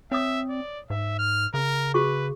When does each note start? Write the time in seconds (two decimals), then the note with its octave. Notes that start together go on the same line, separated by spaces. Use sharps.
0.11 C4 C#5 E5 D#6
0.49 D5
0.90 G#2 E5
1.19 F6
1.54 C#3 A#4
1.94 F#4 G#4 B4 C#6